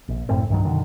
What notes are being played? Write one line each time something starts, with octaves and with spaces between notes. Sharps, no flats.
A#1
F#1 A2 A3 C4
C2 G2 D#3 F#3
F#2 B2 D3 D#3